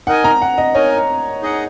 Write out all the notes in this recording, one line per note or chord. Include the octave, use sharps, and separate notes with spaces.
D#4 A#4 D#5 F#5 G#5
A#5
F#5
D#5
D#4 A#4 C#5 D#5 G#5
D#4 G#4 D#5 F#5